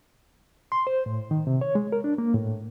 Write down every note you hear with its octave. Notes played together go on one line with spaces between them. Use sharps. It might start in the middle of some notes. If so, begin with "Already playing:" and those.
C6
C5
A2
D#3
C3
C#5
G#3
A#4
D4
A#3
A2